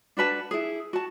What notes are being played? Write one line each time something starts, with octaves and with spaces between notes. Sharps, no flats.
D4 F#4 B4 A5
E4 G#4
F#4 A5